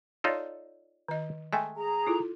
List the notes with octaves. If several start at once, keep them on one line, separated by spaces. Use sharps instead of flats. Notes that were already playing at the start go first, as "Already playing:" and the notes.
D#4 F4 A4 C#5 D5
D#3 D#5
G#3 A3 G5 G#5
G#4 A#5
E4 F4 A4